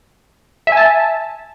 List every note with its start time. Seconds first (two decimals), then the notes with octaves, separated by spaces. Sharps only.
0.67 E5
0.72 G#5
0.77 A5